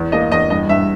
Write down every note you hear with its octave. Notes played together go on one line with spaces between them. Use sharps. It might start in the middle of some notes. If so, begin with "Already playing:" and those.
Already playing: E2
A#3 D#5
E2 D#5
G2 D#5
G2 E5